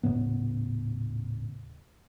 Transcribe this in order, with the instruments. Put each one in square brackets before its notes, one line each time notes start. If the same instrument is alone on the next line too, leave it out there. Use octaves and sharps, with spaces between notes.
[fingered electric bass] D#1 A2 C#3 B3